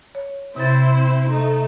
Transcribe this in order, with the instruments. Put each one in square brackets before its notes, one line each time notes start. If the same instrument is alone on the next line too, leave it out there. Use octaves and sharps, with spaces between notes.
[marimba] C#5
[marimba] C3 A6 [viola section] C4 E4 C5
[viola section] A3 D#4